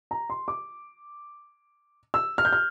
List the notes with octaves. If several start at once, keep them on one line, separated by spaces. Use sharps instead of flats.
A#5
C6
D6
E6
F6
G6
F6